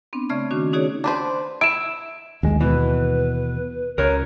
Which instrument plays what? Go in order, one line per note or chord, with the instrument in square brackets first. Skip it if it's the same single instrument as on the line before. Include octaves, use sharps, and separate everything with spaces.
[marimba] B3 C4 D4
C#3 A3 D5 E5 C#6 G#6
D#3 C#4 D4 F#4
C#4 D#4 F#4 G#4 C#5 D5
[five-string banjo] D4 B4 C5
[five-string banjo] E4 [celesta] D7 E7
[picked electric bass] D1 G#3 [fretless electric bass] D#2
[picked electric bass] B2 [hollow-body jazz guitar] E3 [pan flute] B4
[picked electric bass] C#2 [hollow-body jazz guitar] A#4 C#5